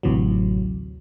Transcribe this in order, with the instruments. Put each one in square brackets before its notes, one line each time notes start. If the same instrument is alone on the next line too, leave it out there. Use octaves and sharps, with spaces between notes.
[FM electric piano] A1 D2 C3 E3 F#3